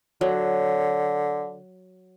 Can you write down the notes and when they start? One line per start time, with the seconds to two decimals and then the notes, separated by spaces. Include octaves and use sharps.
0.21 D3 F#3